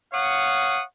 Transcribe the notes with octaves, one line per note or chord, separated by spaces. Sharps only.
C#5 F5 F#5 D#6